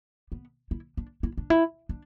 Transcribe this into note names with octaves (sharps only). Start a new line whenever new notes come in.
B3
E4
D4
E4
D4
E4
D4